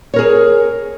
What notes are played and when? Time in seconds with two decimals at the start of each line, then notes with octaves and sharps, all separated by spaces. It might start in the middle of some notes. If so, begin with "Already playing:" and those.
0.14 C#5
0.16 A#4
0.19 G#4